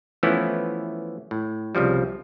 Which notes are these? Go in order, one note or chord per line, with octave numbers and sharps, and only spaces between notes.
E3 F3 A3 B3 C#4 E4
A2
C2 C#3 F3 G3